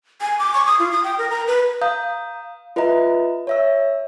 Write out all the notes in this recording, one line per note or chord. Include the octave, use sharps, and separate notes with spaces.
G#5
D6
C#6
D#6
F4
D#6
G5
A#4
A#5
B4
F5 A#5 D#6 G6
F4 B4 D#5 E5 A#5
C#5 E5 E6